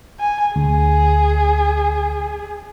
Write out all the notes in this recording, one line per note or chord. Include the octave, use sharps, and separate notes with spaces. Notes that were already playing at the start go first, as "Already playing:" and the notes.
G#5
D2 G#4